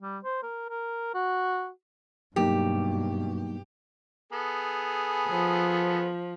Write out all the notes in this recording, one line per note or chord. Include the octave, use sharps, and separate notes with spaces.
G3
C5
A#4
A#4
F#4
G2 B2 F#3 A#3 D#4 G4
B3 G#4 A4
F3